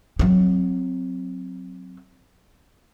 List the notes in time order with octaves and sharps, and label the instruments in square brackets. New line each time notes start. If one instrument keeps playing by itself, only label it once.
[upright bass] F#3 C4